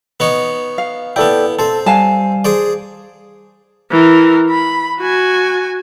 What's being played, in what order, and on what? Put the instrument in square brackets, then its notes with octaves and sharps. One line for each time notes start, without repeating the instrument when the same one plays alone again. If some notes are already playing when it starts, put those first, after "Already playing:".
[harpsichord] B3 D#4 C#5
[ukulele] F5
[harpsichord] B3 E4 [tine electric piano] A4 D5 G5
[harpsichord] C4 C5 [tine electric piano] A4 A5
[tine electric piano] G3 [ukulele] F5 G#5 A5
[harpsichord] G#4 C5 D5
[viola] E3 A#4
B5
F#4 G#5